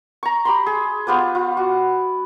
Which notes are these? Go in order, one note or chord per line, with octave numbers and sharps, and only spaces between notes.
A#5 C#6
G4 B5 C6
G#4
B3 F4 G4 B4
F4
F#4